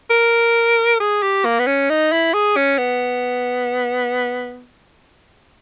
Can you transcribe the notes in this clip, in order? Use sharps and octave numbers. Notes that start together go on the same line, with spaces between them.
A#4
G#4
G4
A#3
B3
C#4
D#4
E4
G#4
C#4
B3